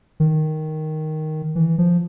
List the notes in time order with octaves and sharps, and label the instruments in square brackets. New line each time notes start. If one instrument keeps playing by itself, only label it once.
[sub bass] D#3
E3
F3